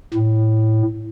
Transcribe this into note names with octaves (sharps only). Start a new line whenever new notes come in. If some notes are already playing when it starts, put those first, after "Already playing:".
A2